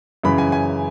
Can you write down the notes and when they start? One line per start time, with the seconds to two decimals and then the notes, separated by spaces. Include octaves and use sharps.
0.24 F#2 C#3 E3 B5
0.38 G#5
0.52 G#5